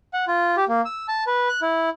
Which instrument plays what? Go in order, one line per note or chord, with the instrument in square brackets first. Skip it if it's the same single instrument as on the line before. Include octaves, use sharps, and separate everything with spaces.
[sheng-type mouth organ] F#5
F4
G4
A#3
E6
A5
B4
F#6
E4